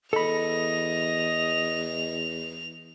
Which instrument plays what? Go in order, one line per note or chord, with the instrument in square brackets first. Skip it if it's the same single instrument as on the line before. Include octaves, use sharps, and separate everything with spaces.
[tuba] E2 [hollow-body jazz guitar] A4 B5 [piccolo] D#5 [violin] F7